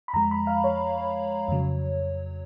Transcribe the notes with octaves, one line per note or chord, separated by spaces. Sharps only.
B5
F2 F3 G#3 A#5
B5
F5
C#5
F2 C#3 F#3